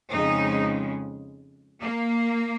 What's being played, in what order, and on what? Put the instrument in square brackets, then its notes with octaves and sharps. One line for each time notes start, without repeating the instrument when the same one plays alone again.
[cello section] F2 C#3 G#3 D#4
A#3